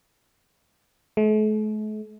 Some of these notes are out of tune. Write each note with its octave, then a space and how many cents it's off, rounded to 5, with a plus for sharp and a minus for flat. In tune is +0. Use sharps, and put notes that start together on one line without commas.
A3 -45